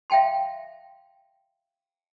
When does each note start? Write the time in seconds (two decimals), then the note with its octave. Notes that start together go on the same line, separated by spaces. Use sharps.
0.10 E5 F5 G5 A5 C6